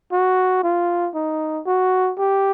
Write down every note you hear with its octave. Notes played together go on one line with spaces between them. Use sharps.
F#4
F4
D#4
F#4
G4